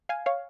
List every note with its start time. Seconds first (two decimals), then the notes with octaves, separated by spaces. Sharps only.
0.09 F5 G#5
0.26 C#5 F5